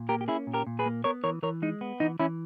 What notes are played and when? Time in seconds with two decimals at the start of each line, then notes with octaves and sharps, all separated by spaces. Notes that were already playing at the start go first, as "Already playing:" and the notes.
Already playing: A#2
0.09 A#3 G4 A#4
0.21 G4
0.28 C#4 E4 G#4
0.47 A#2
0.54 G4 A#4
0.67 A#2
0.79 G#4 B4
0.86 A#3
1.04 B3 A#4 C#5
1.24 E3 A#4 C#5
1.43 E3 A#4 C#5
1.62 G#3 D#4
1.81 B3
2.00 E3 D#4
2.19 E3 C#4 E4